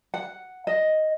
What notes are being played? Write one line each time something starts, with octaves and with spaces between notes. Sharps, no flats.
F#5
D#5